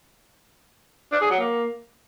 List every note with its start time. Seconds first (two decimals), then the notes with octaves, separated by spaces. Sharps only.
1.12 D4
1.21 G#4
1.30 F#3
1.39 A#3